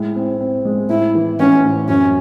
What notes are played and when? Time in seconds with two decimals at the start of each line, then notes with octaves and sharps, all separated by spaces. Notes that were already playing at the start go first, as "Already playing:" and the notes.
Already playing: A2 G#3
0.15 C4
0.41 C4
0.65 G#3
0.89 A2 E4
1.15 E3
1.39 A1 C#4
1.65 A2
1.89 F#2 C#4